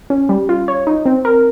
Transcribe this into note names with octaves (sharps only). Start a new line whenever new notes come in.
C#4
G3
F4
C#5
D#4
C4
A#4